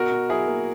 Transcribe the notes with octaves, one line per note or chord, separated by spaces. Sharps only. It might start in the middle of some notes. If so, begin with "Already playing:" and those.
Already playing: B2 F#4 A#4
B2
F#3 E4 G#4
A#3